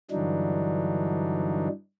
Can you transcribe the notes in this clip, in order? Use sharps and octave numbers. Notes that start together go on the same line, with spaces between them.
G2 D3 E3 F#3 D4 D#4